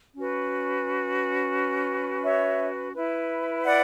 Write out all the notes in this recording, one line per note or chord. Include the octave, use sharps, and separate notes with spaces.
C#4 F#4 B4
C#5 E5
E4 B4
D5 F#5